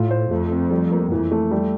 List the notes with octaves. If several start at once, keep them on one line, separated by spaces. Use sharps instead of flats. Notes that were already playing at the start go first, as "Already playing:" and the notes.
Already playing: A2 F4
C5
F2 A3
C4
G3
A#3
F2 E3
A3
G3